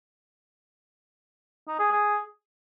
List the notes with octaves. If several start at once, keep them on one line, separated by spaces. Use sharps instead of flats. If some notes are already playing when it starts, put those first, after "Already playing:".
D#4
G#4
G#4